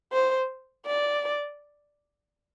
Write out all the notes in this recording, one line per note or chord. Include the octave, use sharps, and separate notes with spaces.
C5
D5